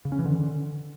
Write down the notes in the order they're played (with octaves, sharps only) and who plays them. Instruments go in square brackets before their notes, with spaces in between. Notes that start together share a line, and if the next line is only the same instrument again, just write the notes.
[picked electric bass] C#3
C#4
E3
D3